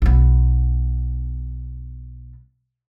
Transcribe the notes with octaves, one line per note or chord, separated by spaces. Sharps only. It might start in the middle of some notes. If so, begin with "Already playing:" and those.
B1 B3